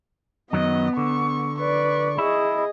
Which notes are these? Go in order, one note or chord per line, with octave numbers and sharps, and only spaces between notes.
F#2 D#3 F#3 B3 D#5
D3 C#6
B4 D5 C#6
E4 G#4 D#5